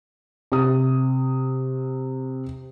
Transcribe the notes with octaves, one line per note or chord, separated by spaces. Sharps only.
C3 C4 D#6